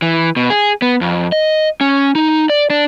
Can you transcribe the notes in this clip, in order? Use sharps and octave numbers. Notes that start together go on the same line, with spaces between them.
E3
B2
G#4
B3
F2
D#5
C#4
D#4
D5
D4